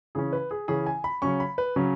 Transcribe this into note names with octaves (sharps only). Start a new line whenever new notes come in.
C#3 E3 C#4 G#4
B4
G#4
C#3 E3 C#4 G#4
G#5
B5
C#3 F#3 C#4 C#6
B5
B4
C#3 F#3 C#4